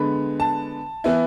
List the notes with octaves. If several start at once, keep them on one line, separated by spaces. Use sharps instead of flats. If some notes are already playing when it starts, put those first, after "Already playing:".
Already playing: D3 G#3 B3 B5
A5
E3 B3 E4